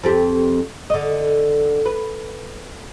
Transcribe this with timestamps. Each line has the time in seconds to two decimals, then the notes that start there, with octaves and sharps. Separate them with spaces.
0.03 F2 C4 G4
0.90 D3 D#5
1.86 B4